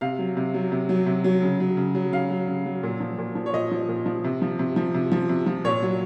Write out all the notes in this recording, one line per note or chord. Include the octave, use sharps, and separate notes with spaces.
C3 F5
F#3
C3
F#3
C3
F#3
C3
F#3
C#3
F#3
C#3
F#3
C#3 F5
F#3
C#3
F#3
A#2
F3
A#2
F3
C#5
A#2 D#5
F3
A#2
F3
C3
F3
C3
F3
C3
F3
C3
F3
A#2 C#5
F#3